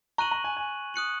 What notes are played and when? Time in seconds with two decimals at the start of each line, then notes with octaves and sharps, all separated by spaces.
0.18 A#5 C#6 F#6 D#7 F#7
0.31 A#5
0.44 G#5
0.57 G#5
0.94 D#6 F#6 C#7 F#7